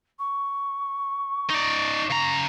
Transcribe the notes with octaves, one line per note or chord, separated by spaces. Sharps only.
C#6
D#4 D5
C#3 A#5